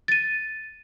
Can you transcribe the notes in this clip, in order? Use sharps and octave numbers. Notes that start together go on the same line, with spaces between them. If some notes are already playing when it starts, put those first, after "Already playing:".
A6 D#7